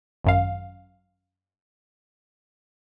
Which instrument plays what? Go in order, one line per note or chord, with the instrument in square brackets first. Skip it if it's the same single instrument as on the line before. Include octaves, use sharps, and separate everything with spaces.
[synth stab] G#1 F#2 F5